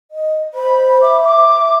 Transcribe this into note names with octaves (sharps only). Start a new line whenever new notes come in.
D#5
C5 B5
E5 D6
D6